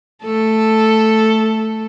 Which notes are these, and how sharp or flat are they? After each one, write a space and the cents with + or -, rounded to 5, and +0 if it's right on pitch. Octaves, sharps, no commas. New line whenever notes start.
A3 +0 A4 +0